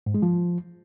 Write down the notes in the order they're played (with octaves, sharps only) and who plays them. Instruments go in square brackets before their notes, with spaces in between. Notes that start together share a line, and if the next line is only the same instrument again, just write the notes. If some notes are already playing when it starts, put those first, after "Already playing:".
[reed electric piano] G#2
G#3
F3